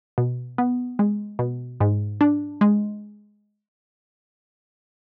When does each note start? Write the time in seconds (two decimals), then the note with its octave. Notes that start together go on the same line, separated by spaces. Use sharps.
0.18 B2
0.58 B3
0.99 G#3
1.39 B2
1.80 G#2
2.21 D4
2.61 G#3